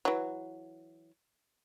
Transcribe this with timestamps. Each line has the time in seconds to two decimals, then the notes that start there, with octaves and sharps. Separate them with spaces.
0.05 E3 F#3